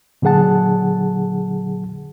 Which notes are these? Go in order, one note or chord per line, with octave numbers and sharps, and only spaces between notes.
A#2 D3 F#3 G#4 F#5 A5